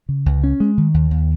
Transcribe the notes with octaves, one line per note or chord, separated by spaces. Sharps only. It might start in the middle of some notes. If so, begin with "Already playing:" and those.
C#3
C#2
C#4
G#3
D#3
D#2
D#2